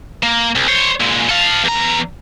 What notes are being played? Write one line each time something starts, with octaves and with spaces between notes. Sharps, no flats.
A#3
C2
C5 C#5
A#2 G#3
A4 F5
E2 A#5